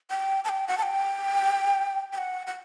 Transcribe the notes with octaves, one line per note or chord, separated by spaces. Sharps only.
G5
A5
G5
F#5
A5
G5
G5
F#5
F#5